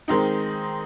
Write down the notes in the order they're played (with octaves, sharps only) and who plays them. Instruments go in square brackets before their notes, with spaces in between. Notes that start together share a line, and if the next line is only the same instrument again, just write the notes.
[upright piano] D#3 G#3 C4 D#4